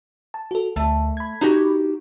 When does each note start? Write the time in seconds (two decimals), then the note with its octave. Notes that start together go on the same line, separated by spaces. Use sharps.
0.34 A5
0.51 F#4 A4
0.76 D2 A3
1.17 B5 G#6
1.41 D#4 F#4 G4